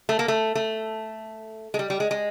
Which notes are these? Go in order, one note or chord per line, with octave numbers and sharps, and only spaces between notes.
A3
A#3
A3
A3
G#3
G3
G3
G#3
G#3